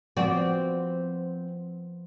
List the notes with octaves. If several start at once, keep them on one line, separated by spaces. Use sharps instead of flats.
F3 B3 C4 F#4 D5